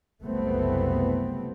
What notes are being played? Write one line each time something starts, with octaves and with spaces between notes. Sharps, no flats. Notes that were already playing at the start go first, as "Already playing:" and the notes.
F#1 C2 A3 B3 C4